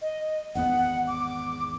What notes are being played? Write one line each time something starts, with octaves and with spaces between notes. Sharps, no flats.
D#5
G#1 E2 B3 F#5
D6